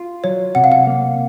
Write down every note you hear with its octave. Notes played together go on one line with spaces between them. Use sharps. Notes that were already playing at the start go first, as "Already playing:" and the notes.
Already playing: F4
F#3 C#5
C3 F#5
F5
F#5
A#3